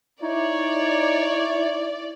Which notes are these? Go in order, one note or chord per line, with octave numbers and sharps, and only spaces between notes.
D#4 E4 C#5 D5